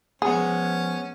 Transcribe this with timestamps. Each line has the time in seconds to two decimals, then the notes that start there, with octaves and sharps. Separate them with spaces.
0.22 F3 G#3 B3 C#4 G#4